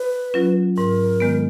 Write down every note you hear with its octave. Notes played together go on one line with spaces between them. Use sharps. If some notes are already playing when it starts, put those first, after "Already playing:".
Already playing: B4
F#3 C#4 F4
G#2 A#4
D#3 G#3 B3